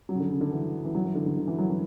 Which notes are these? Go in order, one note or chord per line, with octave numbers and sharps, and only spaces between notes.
F#3
C#3
D3
C#3
D3
E3
E3
F#3
E3
D3
D3
D3
E3
F#3
E3